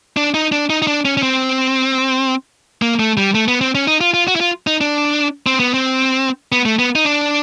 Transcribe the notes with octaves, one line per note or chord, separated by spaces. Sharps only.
D4
D#4
D4
D#4
D#4
D4
C#4
C#4
C4
A#3
A3
G3
A3
B3
C4
C#4
D#4
F4
F4
F#4
E4
F4
D#4
D4
C4
B3
C4
B3
A3
B3
D#4
D4